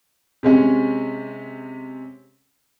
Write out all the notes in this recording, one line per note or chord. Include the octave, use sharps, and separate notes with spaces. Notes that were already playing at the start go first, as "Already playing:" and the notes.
C3 G#3 C#4